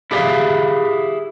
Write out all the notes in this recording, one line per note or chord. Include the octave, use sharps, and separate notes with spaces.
E4 G4 G#4 D5 E5 F5